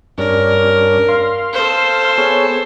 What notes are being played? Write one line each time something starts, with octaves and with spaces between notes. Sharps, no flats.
G2 C#4 D4 A#4
F5 C6
A4 C5
B3 G#4 C#5